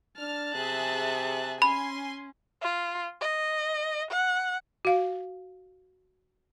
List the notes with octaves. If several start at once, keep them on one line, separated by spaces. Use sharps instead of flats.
D4 A5 F6
C3 G#4 E5 F#6
C#4 G#5 B5 C6
F4
D#5
F#5
F#4 F5